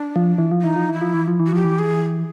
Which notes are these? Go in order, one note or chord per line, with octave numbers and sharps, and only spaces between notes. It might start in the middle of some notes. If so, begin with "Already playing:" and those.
Already playing: D4
F3
E3
F3
E3 D#4
F3
E3 E4
F3
E3
F3
E3
F#4
F3 G4
E3
G#4